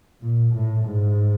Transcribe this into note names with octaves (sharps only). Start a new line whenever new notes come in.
A#2
A2
G#2